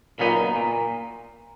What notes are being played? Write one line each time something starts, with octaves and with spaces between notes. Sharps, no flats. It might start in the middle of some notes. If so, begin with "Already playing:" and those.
A#2 C#3 F#3 B3 D#4
A#2